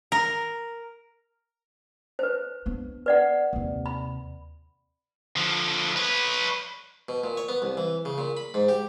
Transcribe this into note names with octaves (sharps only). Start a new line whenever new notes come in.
A#4
B4 C5
B3 D4
B4 D5 F#5
D#2 C3
B5
D3 F3
B4 C#5
B2
A#2
C#5
B3
C2
E3
C#3
A#2
B5
G#2
G4